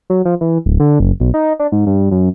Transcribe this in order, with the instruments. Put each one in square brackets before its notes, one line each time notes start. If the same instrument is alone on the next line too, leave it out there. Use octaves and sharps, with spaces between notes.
[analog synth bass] F#3
F3
E3
D1
D3
F#1
B1
D#4
D4
G#2
G2
F#2